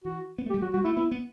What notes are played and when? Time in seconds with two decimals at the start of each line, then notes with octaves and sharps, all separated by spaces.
0.05 E3 F#4
0.38 B3
0.46 A3
0.50 G4
0.54 G3
0.62 F#3 F#4
0.74 G3 F#4
0.84 A3 E4
0.96 B3 E4
1.11 B3